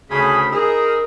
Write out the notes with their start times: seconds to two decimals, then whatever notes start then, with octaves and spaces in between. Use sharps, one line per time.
0.11 D2 C#3 G#4 G#5 B5 D#6
0.52 D#4 G#4 A#4 D#6 E6